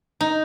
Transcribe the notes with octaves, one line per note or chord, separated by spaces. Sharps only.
D#4